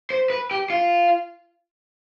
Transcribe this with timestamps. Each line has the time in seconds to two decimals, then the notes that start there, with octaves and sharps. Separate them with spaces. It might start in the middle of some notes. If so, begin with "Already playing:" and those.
0.10 C5
0.30 B4
0.51 G4
0.70 F4